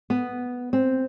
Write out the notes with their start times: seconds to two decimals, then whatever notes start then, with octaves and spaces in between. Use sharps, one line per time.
0.10 B3
0.73 C4